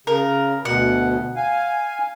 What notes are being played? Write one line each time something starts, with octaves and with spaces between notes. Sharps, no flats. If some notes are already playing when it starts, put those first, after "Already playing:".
C#3 A#4
D2 B2 F#5
F5 G#5